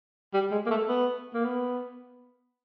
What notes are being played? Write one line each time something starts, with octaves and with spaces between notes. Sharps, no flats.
G3
G#3
A#3
A3
B3
A#3
B3